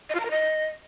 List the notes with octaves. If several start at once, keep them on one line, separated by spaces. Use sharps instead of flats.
D#5
F4
A#5
A#4
D#5